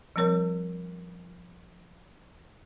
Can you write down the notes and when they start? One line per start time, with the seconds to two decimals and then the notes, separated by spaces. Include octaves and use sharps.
0.16 F3 G3 C4 A#4 C#5